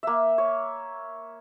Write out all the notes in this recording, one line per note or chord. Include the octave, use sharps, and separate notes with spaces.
A#3 E5
C#5